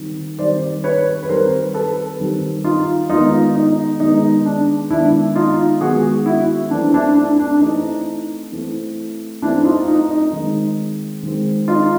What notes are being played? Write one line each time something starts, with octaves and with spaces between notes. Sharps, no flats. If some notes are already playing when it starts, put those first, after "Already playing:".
Already playing: D#3 G3 C4
D#3 G3 C4 C5 D5
B4 C#5
B4
D#3 G3 C4 A#4 C5
A4 B4
D#3 G3 C4
D#4 F4
D#3 G#3 B3 D#4 F4
D#4
D#3 G#3 B3 D#4
D4
D#3 G#3 B3 D4 E4
D#4 F4
D#3 G#3 B3 F#4 G#4
E4 F#4
E3 A3 C4 D4
D4 E4
D4
D4
E3 A3 C4 D#4
E3 A3 C4
E3 A3 C4 D4 E4
D#4 F4
D#4
D#4
D#3 G#3 C4
D#3 G#3 C4
D#4 F4